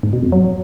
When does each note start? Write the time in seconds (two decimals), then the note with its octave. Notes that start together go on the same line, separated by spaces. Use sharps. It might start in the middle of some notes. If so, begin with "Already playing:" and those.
0.03 G#2
0.13 B2
0.23 F2
0.32 F#3